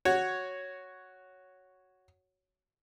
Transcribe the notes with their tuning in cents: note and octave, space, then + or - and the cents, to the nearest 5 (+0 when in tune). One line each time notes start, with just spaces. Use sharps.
F#4 +0 C#5 +0